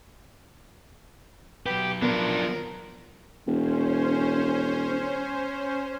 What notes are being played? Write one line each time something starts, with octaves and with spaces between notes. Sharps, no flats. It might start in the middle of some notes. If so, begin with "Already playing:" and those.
F#3 B3 G4 B4
F3 B3 D4 A#4
E1 C#4 C5